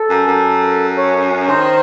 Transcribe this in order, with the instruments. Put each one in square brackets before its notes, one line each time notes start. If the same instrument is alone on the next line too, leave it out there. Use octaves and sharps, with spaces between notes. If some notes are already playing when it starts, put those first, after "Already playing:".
Already playing: [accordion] A4
[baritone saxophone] F#2
F#2
[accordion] C#5
[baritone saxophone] D#3 [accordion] C5